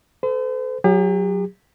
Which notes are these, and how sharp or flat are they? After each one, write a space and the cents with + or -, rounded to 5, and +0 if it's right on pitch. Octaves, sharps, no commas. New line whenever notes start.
A4 +0 C5 -40
F#3 +0 G4 +45